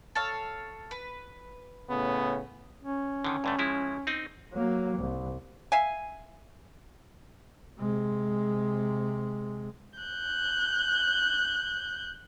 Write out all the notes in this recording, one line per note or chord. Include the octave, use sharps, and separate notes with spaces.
A4 C#5 F5
B4
A2 C#3 B3
C#4
D3 D#3
G2 D3 A3
F3 G#3 E4
C4 D#4
F#3 A#3
C2
E5 F5 G#5
C3 G#3
F#6 G6